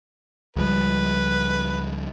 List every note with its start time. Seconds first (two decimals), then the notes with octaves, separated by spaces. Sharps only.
0.56 C#2 F3 G3 B4